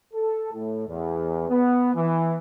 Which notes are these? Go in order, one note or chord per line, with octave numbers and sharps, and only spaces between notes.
A4
A2
E2
B3
E3